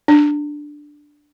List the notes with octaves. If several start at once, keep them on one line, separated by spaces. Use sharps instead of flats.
D4